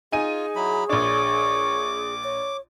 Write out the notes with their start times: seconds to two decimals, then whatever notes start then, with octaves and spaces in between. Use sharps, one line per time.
0.12 D#4 F4 G#4 G#5 D#7
0.56 F#3 E4 B5
0.89 A#1 D4 C#5 D6
2.24 C#5